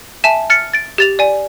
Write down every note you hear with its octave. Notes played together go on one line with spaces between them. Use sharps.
E5 G#5 A5 E7
F6 A6 C#7
A6 D7
G4 A6 F7
D5 G#5